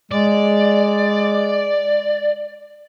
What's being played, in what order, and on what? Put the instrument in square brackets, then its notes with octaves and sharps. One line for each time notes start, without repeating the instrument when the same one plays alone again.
[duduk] G#3 [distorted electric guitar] D5